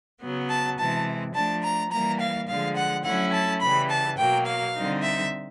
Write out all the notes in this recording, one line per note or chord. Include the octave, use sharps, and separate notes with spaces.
C#3 F#3 B3
A5
C3 E3 G#3 A5
F3 A3 D4 A5
A#5
E3 G3 A#3 A#5
F5
D3 F3 G#3 F5
F#5
F#3 A3 C#4 E4 F#5
A5
C#3 E3 G3 B5
A5
B2 F#3 A#3 G5
F5
D3 G3 C4 D#4
E5